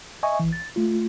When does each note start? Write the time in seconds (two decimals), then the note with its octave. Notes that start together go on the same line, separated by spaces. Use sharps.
0.23 D#5 E5 G#5 C#6
0.40 A#1 E3
0.53 A6
0.76 A3 F4